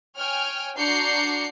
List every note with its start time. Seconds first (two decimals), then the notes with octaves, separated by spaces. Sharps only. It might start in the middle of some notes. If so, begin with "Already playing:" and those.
0.17 C#5 G5 G#5 F6
0.77 D4 F#4 A#5 G6 C7 C#7